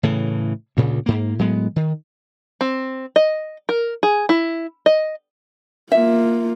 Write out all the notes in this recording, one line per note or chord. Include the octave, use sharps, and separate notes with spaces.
A2 C#3 E3
D2 A#2 C#3
G#2 A#3
A2 F#3 G#3 B3
D#3
C4
D#5
A#4
G#4
E4
D#5
A#3 F4 E5